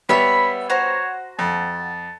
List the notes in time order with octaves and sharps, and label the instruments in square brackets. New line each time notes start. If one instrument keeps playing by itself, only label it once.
[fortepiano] G3 B3 [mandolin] C#5 E5 F#5 [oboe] B5
[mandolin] F#4 C5 A#5 [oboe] C#5
[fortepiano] F2 [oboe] A5